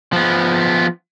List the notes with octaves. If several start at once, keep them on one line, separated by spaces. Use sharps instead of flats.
F3 B3